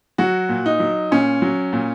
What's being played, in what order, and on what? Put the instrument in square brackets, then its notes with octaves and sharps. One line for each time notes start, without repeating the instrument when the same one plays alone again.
[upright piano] F#3 F#4
A#2
D#4
F#3
A#2 C#4
F#3
A#2